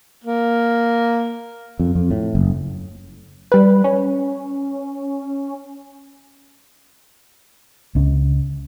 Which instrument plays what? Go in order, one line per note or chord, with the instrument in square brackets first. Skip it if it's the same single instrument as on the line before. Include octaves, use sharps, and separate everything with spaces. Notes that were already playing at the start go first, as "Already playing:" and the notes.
[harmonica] A#3
[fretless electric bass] F2
F2
A2
F#1
[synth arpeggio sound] G3 B4
C#4
[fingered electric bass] C#2 C#4